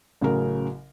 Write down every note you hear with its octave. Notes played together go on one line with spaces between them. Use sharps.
A1 C#3 F#3 A#4